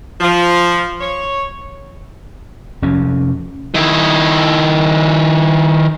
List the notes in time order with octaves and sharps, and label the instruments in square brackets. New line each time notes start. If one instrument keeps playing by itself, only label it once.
[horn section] F3
C#5
[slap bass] F1 F2 C3 C#4
[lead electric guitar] D#3 E4